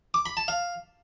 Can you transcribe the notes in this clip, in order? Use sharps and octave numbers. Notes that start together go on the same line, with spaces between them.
D6
B5
A5
F5